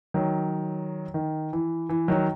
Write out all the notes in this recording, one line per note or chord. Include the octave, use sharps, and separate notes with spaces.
D#3 F#3
D#3
E3
E3
D#3 F#3